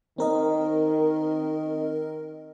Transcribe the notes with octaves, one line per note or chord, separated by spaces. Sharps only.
D#3 C4 A#4 D#5